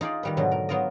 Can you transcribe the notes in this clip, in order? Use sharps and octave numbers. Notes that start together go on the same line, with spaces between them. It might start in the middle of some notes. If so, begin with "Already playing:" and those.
D#4 F4 G#4 D5
D#3 G3 B4
G#2 B2 D3 F#3
A#4
F#3 B3 F4 A#4 D#5